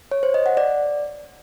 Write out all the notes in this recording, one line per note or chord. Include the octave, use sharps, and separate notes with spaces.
C#5
C5
D#5
F#5
D5